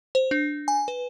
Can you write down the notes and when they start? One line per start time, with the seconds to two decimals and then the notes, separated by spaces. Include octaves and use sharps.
0.15 C5
0.31 D4
0.68 G#5
0.88 B4